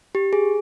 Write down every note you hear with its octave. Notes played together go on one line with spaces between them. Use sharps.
G4
G#4